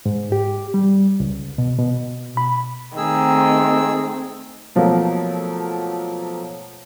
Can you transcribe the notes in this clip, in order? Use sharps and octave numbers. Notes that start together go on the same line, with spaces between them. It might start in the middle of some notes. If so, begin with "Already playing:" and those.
G#2
G4
G3
C#2
B2
B2
B5
D#3 A3 C4 G#4 E6
B2 F3 F#3 A3 A#3